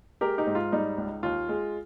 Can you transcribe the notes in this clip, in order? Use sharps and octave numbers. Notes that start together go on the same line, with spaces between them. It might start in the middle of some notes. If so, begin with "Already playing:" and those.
G#3 G4 A#4
D#4 G4
G#2
F4
G3 D#4
C#2
D#2 F4
G#3